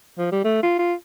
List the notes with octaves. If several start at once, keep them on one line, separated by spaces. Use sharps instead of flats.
F3
G3
A3
F4
F4